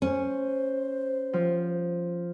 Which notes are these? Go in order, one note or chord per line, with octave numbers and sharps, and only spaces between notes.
C#4 C5
F3